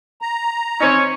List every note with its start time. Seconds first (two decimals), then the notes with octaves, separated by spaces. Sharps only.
0.22 A#5
0.80 C4 C#4 D#4 C#5